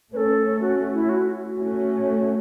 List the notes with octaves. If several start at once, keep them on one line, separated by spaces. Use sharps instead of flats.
A3 C#4 A4 B4
A3 C#4 F#4
E4
F#4
F#4
A3 C#4 F#4